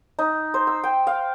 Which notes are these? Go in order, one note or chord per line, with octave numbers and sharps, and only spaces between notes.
D#4
C5
E6
G5
F5